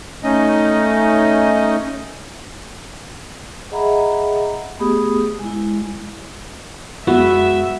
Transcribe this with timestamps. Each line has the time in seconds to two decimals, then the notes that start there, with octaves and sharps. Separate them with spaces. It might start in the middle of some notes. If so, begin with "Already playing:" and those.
0.24 A3 C#4 D#4 D#5
3.71 G#4 D#5 E5 F#5 A#5 B5
4.79 A3 B3 G4 G#4 B5 D#6
5.39 G#3 E4
7.07 F#2 G#3 B3 F#4 E5